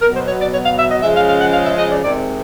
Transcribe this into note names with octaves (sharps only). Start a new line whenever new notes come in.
B2 F#3 B3 A#4
C5
C#5
D5
C#5
F5
E5
D#5
C#3 F3 G#3 C#4 E5
F5
F5
F#5
F5
E5
D#5
D5
C3 D#3 G#3 C4 D5